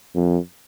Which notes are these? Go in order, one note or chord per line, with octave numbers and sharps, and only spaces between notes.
F2